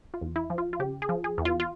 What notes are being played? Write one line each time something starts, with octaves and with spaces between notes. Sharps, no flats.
F4
E2
E4
F3
F4
F4
C#3 G4
G#4
F3
G#4
E2
F4
F4